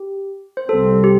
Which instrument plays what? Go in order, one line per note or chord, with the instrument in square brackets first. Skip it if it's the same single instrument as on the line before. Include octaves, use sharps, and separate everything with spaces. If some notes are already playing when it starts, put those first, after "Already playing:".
Already playing: [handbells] G4
C5
[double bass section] C2 C3 G3 C4 [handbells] A4
[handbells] G4